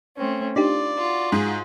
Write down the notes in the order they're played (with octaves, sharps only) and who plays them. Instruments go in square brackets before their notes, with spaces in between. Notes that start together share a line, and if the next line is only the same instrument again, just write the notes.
[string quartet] A3 C4 C#4
[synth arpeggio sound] D4 D#4 G4 [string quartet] F4 [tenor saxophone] D5
[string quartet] F4 F#4
[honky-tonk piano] G#2 [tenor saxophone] G#4